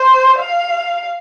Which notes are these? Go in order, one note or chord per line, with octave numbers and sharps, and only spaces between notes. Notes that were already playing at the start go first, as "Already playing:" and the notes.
Already playing: C5
F5